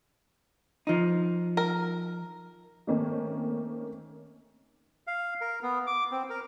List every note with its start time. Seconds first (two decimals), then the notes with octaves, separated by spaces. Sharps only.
0.87 F3 D#4
1.57 A#4
2.87 D#3 A3 A#3 C4 C#4
5.07 F5
5.41 A#4
5.63 B3
5.87 D6
6.12 C4
6.30 A#4